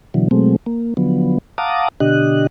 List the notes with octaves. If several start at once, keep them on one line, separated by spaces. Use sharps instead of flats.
B2 D3 E3 F#3
B2 F#3 G#3 A3 C4
A#3
D3 F3 F#3 B3
F5 F#5 A5 A#5 D6 D#6
B2 D3 D4 G4 D#5 F#6